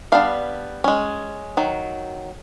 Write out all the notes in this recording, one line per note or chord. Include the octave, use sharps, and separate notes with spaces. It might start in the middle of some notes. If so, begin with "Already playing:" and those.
G3 B3 D4 F5
G#3 C#4
D#3 F#3